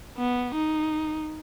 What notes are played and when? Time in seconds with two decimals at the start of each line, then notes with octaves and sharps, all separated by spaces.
0.18 B3
0.54 D#4